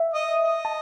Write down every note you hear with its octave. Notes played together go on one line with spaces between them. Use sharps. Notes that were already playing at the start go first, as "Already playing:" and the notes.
Already playing: E5
D#5
D#5
A5